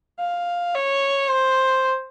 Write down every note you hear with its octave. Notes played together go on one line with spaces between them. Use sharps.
F5
C#5
C5